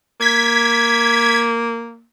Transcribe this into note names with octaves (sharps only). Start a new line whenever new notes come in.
A#3 G#6 B6